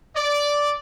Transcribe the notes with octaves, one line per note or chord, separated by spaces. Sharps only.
D5